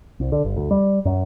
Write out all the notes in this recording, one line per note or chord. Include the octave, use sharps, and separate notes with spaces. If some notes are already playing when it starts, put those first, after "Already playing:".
C2
D3
G1
D2
G3
F#2